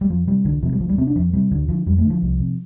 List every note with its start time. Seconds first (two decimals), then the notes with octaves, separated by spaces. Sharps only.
0.01 G3
0.09 F2 F3
0.27 C3 G3
0.45 C2 D3
0.62 C3 F3
0.73 G3
0.80 D2 F3
0.89 G3
0.98 C3 C4
1.07 D4
1.16 F2 F3
1.33 C3 G3
1.51 D2 D3
1.68 D3 F3
1.86 F2 G3
1.98 A3
2.04 D3
2.10 F3
2.22 C2
2.40 C3